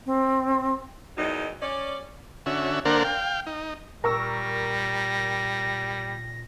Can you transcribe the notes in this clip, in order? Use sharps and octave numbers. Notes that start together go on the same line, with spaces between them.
C4
E2 D#3 F#3 D#4
C#4 D5
D3 C#4 F#4 E5
D3 A#3 D4 A#4 C5 F#5
F5 G5
D#4
A#2 G3 A#4 C#6 E6 A#6